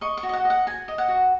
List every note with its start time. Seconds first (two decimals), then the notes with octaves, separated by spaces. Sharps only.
0.01 D#5 C#6
0.17 C#6
0.23 F#4
0.29 D#5
0.33 F#5
0.45 D#5
0.50 F#5
0.67 F#4 G#5
0.88 D#5
0.98 F#5
1.08 F#4